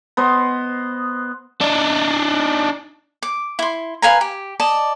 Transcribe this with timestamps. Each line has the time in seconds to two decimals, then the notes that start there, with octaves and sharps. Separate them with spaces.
0.17 B3 C5 D#5
1.61 D4 D#4
3.23 D6
3.59 E4 C6
4.02 B4 F5 G#5 A#5
4.21 G4
4.60 D5 D#5 A5